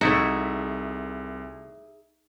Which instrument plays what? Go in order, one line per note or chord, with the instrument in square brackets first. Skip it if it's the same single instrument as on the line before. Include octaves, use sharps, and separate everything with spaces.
[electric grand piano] C2 [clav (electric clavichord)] A3 E4 F#4 [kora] D#4 [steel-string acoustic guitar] G#4 E5